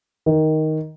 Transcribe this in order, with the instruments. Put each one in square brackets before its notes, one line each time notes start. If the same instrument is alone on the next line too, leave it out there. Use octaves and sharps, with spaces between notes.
[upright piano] D#3